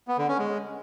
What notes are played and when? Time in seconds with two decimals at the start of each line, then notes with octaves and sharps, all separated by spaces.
0.08 B3
0.18 D3
0.28 C#4
0.38 G#3